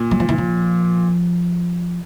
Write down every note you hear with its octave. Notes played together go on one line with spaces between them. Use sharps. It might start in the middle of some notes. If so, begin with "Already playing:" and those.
Already playing: A#2
F#3
F3
E3
F3